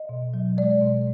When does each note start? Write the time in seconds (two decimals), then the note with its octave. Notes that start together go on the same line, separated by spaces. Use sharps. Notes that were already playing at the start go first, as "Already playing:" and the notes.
Already playing: D#5
0.09 B2
0.34 F#3
0.57 G#3 D5
0.82 B2